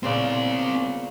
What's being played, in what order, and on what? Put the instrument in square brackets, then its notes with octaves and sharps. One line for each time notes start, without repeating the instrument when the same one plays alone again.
[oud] A#2 C#3 B3 [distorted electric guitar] C4 D5